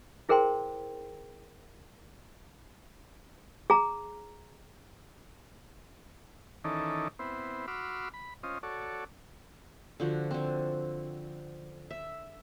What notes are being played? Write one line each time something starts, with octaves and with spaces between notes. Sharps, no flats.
E4 G#4 A#4 C5 G5 C6
G#4 A#5
D#3 E3 C#4 D#4 A4 D5
B3 C4 E4 C5
F#4 B5 C6 D6 E6 F6
B5
C#4 F4 C5 D#5
F#4 A4 C#5 D5
D3 F3 F#4
D3 C4
E5